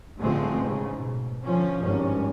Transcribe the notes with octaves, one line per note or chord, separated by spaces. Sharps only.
A1 D3 F3 G#3 A3 C4
G#2 C#3
B2
D3 F3 C#4
G#1 G2 C#4